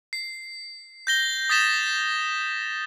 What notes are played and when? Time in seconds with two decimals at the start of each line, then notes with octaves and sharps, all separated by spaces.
0.13 C7
1.07 G6 A#6 G7
1.50 D#6 A6 B6 E7 G7